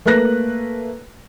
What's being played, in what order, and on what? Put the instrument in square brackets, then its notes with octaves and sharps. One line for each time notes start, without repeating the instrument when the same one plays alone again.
[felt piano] A3 A#3 B4 F#6 A#6